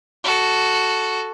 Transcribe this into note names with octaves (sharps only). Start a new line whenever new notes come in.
F#4 A4